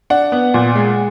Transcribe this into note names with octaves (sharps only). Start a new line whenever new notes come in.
D4 F#5
B3
A#2
G#3